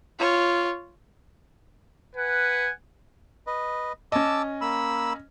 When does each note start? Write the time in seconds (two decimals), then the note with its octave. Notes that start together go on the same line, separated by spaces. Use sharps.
0.19 F4 C#5
2.16 B4 F#5 G#5
3.47 B4 D#5
4.12 C#4 D#5 A5 D6 E6
4.61 A#3 B5 E6